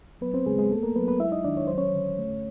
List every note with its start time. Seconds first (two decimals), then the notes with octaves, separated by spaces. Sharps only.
0.21 F#3 B3 B4
0.34 C4 C5
0.46 C#3 G#3 G#4
0.59 G#3 G#4
0.71 A3 B3 A4
0.83 A#3 A#4
0.95 F#3 B3 B4
1.08 B3 B4
1.20 G#3 E4 E5
1.32 D#4 D#5
1.44 D#3 D4 D5
1.57 C#5
1.67 F#3 C5
1.78 C#4 C#5
1.94 D3
2.19 A3